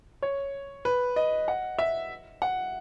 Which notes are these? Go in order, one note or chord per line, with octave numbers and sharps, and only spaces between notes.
C#5
B4
D#5
F#5
E5
F#5